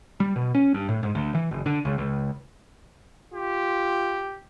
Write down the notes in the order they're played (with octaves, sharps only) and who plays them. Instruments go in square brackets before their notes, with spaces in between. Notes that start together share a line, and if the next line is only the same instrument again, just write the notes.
[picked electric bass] G3
B2
C#4
G2
A2
G#2
D2
E3
F#1
D3
C#2
C#2
[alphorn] F4 [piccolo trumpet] G4